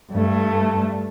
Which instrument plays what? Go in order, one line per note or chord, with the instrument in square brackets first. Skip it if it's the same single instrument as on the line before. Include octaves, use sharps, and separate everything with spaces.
[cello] G2 A3